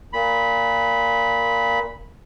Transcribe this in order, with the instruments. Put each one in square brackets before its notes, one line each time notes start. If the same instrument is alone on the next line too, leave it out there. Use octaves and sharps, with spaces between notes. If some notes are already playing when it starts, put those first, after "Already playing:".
[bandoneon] A#2 B5